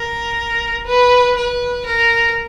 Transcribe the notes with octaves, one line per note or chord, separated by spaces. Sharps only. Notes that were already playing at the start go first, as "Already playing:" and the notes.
Already playing: A#4
B4
B4
A#4